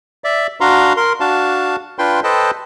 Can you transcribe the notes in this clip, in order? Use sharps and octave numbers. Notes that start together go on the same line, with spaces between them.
D5 E5
D4 F#4 F5 A#5 C6
A#4 C6
D4 F#4 F5 A5
D4 F4 B4 G5 C6
A4 B4 C5 D#5 G5 A5